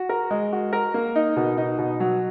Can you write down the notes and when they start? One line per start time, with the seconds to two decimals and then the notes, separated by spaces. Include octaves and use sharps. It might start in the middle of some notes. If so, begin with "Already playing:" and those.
Already playing: F#4
0.09 A#4
0.31 G#3
0.53 F#4
0.73 A#4
0.94 A#3
1.15 D#4
1.36 B2
1.58 D#4
1.79 B2
2.00 F#3